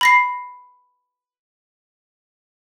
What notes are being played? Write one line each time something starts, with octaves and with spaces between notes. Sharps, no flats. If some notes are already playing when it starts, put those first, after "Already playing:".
B5 A#6 C7